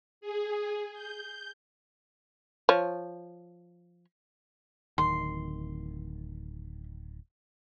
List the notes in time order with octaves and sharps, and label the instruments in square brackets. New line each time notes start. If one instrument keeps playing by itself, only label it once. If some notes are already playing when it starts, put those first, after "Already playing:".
[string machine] G#4
G6
[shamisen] F3 C#5
[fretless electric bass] D1 D#3 [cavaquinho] C6